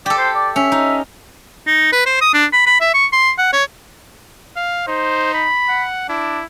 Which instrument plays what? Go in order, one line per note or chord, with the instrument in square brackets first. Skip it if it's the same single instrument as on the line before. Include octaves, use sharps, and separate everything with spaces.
[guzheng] G4 A4 [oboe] D5
[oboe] C5
D5
[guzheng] C#4 [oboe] E5
[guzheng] D#4
[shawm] D#4
B4
C5
D#6
D4
B5
B5
E5
C#6
C6
F#5
C#5
[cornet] F5
[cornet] D#4 [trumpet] C5
[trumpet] B5
[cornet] F#5
[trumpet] D4 [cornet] E4